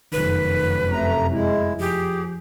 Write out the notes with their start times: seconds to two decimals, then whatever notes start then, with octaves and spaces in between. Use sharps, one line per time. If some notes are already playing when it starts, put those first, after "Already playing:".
0.13 F1 F#2 D#3 B4
0.92 C3 A3 A#5
1.32 G#3 E4
1.80 F3 G4 G#4